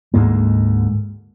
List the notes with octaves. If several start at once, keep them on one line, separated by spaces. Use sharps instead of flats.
D2 G#2 G#3 A#3